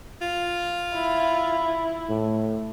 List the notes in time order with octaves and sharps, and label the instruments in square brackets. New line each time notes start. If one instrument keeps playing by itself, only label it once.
[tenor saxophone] F4
[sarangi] E4
[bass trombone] A2